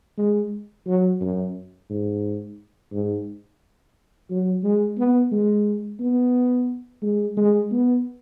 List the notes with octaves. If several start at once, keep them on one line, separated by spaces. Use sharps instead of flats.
G#3
F#3
F#2
G#2
G#2
F#3
G#3
B3
G#3
B3
G#3
G#3
B3